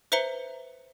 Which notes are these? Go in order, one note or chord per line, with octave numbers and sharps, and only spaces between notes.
B4 C5 E5 A#5 C#7 G7